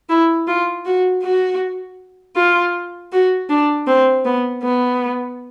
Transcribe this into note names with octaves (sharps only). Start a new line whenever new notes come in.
E4
F4
F#4
F#4
F4
F#4
D4
C4
B3
B3